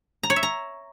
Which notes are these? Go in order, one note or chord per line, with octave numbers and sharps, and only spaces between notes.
A#5
C#5
E5
A#5